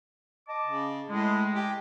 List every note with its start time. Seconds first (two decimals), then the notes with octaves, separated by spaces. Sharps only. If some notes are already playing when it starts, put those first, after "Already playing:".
0.47 D#5 A5 D6
0.67 C#3
1.09 A2 G#3
1.55 G4